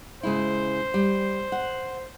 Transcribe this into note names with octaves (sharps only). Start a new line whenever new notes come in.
C#3 G#3 E4 C5
G3
F#5